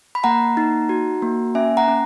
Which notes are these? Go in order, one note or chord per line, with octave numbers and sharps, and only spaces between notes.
B5
A#3 F#5 A#5
D#4
F#4
A#3
C#4 E5 G#5
F#5 A#5
C#4